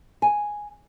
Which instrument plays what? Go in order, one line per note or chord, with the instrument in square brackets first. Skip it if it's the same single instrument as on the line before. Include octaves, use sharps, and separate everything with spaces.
[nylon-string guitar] G#5